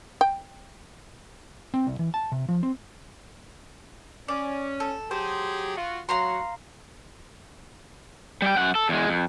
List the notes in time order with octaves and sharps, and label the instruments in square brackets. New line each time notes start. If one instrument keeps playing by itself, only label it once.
[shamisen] G5
[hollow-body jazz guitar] C4
C2
E3
A5
C3
F3
C4
[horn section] C#4 [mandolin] D5
[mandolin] A4
[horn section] F#3 G4 G#4 [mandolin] C5
[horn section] F4 F#4
[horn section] F#3 F#4 [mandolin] F5 A#5 C6
[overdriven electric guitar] G3 G5
F#2 F#5
A4
E2 G#3
F2